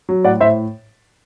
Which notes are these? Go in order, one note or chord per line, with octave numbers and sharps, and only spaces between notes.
F#3
A2 D5 F#5
A2 C5 E5